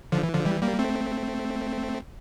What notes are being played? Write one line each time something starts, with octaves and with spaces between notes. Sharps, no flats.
D3 F3
E3
D3 F3
E3 G3
G3 A#3
A3 C4